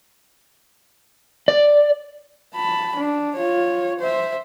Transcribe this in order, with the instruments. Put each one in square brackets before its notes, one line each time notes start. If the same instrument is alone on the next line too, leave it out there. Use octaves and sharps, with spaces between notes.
[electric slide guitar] D5
[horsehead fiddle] A5 B5
D4
F4 C#5
C5 E5